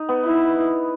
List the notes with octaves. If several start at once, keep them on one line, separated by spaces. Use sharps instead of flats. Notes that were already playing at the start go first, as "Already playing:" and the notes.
Already playing: D#4
B3
E4